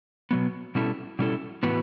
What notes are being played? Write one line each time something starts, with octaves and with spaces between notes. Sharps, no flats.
B2 F#3 B3
B2 G3 C#4 E4 A4
B2 G3 C#4 E4 A4
A2 E3 B3 F#4 B4